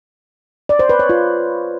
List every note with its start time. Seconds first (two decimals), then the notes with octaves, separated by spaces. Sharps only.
0.69 D5
0.79 C5
0.89 B4
0.99 C#5
1.09 F4